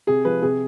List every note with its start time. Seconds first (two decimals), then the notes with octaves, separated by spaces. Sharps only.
0.07 C3 G#4
0.25 F3 B4
0.42 C3 G#4